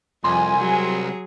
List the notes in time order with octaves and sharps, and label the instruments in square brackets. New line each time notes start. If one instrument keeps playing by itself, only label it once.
[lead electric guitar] C2 [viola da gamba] F2 [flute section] G#5 [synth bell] C6
[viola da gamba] F#3 G#4